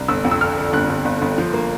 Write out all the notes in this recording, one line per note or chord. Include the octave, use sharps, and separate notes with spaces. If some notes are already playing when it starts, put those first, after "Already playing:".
Already playing: C2
G1 E6
F2
E6
D3 F6
D3
G1 F#6
G1
G1
G1
F3
A#3